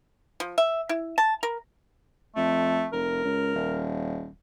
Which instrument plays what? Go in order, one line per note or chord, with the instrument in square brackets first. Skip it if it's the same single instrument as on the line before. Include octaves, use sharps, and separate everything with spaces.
[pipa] F3
E5
E4
A5
A#4
[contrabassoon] F2 [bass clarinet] A3
[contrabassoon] F1 [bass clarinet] A#4
[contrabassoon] C#2
D#1